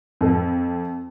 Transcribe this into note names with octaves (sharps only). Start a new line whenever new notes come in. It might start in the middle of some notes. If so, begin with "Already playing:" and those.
F2 A4